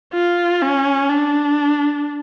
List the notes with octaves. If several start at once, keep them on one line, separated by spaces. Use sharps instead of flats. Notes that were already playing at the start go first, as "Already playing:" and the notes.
F4
C#4
D4